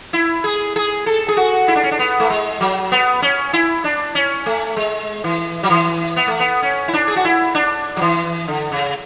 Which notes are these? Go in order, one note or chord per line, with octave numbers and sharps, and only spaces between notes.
E4
G#4
G#4
A4
G#4
F#4
E4
D4
C#4
D4
B3
A3
G#3
F#3
B3
C#4
E4
D4
C#4
A3
G#3
E3
F#3
E3
B3
A3
B3
C#4
E4
D4
G#4
F#4
E4
D4
F#3
E3
D3
C#3